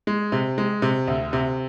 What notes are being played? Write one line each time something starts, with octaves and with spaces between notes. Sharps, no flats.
G#3
C3
G#3
C3
D2
C3